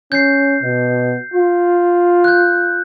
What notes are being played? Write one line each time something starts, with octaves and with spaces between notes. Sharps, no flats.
C#4 G6 C7
B2
F4
F#6 G6